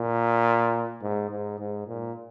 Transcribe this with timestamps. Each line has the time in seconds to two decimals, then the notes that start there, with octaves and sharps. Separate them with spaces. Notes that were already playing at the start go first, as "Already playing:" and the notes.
Already playing: A#2
1.02 G#2
1.31 G#2
1.59 G#2
1.87 A#2